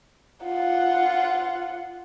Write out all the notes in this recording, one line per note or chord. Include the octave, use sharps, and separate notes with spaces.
F4 F#5